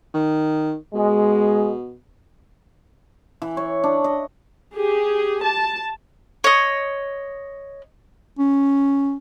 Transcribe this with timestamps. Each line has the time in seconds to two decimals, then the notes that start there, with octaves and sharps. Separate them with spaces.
0.14 D#3
0.94 B2 G#3
3.42 E3
3.57 C#5
3.84 D4
4.04 D#5
4.77 G4 G#4
5.44 A5
6.44 C#5 D#5
8.39 C#4